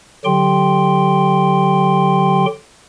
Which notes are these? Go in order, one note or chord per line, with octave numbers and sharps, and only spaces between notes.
D3 F#3 G4 G5 C6